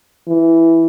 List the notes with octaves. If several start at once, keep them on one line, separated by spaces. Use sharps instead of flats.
E3